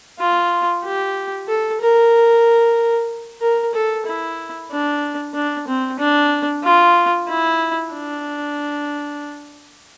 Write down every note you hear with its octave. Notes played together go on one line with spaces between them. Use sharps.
F4
G4
A4
A#4
A#4
A4
E4
D4
D4
C4
D4
F4
E4
D4